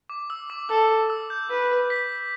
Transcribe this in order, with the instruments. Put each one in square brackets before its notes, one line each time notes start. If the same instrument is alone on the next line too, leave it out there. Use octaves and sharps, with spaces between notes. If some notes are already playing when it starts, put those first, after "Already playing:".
[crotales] D6
E6
D6
[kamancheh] A4 [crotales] E6
[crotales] E6
G6
[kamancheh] B4
[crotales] B6